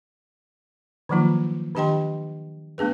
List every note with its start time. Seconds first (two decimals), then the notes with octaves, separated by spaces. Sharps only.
1.09 D#3 F3 F#3 A#3 D#4 F4
1.75 D#3 D4 G4 D#5 G5 C6
2.78 A3 B3 D4 G#4 B4